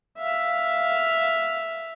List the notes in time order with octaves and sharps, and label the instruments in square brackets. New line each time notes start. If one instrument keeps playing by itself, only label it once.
[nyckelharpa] E5 F5